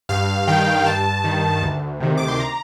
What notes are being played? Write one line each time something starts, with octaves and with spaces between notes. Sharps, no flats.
G2 F5
D#3 G5
G2 A5
D#3
D2
C3 D#3
D6
C6
A#5